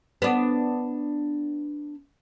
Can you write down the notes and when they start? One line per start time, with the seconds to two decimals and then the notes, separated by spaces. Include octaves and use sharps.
0.22 B3 D4